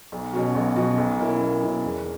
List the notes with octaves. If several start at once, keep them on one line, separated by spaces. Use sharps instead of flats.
B1
B2 F#3 C#4 F#4
B1
B2 F#3 C#4 F#4
B1
B2 A#3 C#4 E4
B1
B2 A#3 C#4 E4
E1